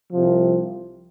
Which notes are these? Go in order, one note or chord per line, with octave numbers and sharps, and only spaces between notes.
C2 C3 F3